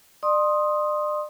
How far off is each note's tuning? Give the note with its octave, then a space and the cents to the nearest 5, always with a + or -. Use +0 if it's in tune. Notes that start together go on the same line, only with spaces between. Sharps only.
D5 +40 C6 +15 D#6 +0